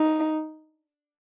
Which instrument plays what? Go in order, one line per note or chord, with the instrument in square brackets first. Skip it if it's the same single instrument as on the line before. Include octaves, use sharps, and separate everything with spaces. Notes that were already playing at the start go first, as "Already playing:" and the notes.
Already playing: [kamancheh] D#4